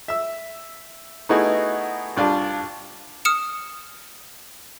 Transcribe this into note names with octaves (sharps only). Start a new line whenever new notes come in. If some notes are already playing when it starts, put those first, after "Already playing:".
E5 E6
A3 B3 D#4 E4 F#4 G#4
C2 D4 F4 G4 A5
D#6 F6 C#7 E7